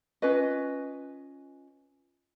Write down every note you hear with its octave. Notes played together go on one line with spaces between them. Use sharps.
C#4 F4 B4 D#5